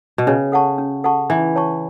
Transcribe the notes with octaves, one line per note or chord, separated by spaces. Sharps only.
B2
C#3 C#4
A4 F#5 A5 C#6
C#4
A4 F#5 A5 C#6
E3 E4
C#5 A5 C#6